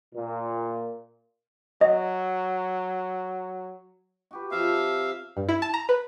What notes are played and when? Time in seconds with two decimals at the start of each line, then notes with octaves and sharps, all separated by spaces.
0.15 A#2
1.81 F#3 D#5
4.31 F#4 G4 B4
4.51 C3 F3 E5 F5
5.37 G2
5.49 E4
5.62 A5
5.74 A#5
5.89 B4